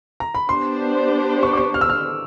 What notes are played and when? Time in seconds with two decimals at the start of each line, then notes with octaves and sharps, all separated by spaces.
0.20 A#5
0.35 B5
0.48 B3 D4 G4 C5 C6
1.43 C#6
1.53 D6
1.57 C#6
1.74 F6
1.81 E6
1.89 F6